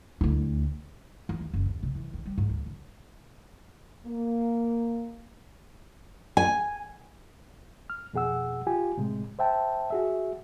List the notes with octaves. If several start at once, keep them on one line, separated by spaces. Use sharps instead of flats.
D2 E4
E3
D#2
F#1
D#2
C3
E3
D#3
G3
G#2
D2
D3
A#3
G#5
F6
F2 B2 G#4 F#5 E6
F4 G4 G#5
A2 C3 G#3
C5 E5 G5 A5
F#4 G#4 E5